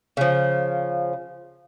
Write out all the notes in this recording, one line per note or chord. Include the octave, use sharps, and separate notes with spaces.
C#3 F3